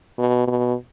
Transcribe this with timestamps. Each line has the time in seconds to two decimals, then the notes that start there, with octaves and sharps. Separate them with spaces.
0.18 B2
0.47 B2